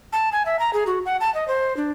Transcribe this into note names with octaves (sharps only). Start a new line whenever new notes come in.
A5
G#5
E5
A#5
G#4
F#4
F#5
A5
D#5
C5
D4